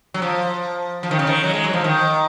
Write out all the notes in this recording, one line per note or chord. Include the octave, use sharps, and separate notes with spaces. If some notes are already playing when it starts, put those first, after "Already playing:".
F#3
F3
F3
D#3
C#3
D#3
F#3
G#3
F#3
F3
D#3